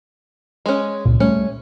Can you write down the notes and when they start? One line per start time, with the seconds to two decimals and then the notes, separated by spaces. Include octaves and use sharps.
0.66 G#3 C#4
1.05 C#2 A#2
1.20 G3 A3 C#4